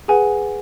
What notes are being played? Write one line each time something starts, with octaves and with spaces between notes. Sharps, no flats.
G#4 B4 F#5 G#5